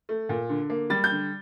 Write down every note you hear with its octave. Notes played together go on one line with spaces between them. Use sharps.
A3
A#2
D3
A#3
G3 A6
G6
D3